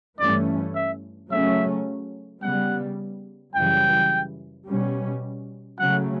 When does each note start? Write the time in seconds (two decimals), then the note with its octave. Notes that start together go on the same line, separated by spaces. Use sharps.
0.19 G2 E3 A3 C#4 D5
0.75 E5
1.31 C#3 F#3 A3 C#4 E5
2.42 C#3 G3 B3 F#5
3.55 F#2 C#3 E3 G3 G5
4.66 B2 G3 C#4
5.79 C#3 F#3 A3 C#4 F#5